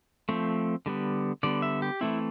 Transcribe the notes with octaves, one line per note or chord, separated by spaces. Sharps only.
F3 A3 C4
D3 G3 B3
D3 G3 B3 D5
E5
G4
E3 A3 C4 E4